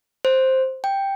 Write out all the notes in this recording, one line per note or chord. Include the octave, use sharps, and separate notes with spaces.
C5
G5